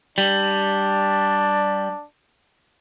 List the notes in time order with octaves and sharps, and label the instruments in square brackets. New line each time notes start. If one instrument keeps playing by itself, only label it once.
[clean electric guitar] G3 [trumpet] D4